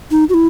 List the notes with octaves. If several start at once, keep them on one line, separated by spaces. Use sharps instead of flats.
D#4
F#4
E4